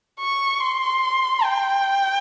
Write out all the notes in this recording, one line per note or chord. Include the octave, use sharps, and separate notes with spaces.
C#6
C6
G5